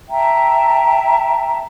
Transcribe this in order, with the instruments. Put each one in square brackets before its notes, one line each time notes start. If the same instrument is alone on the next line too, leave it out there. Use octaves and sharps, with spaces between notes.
[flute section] E5 G5 A5 A#5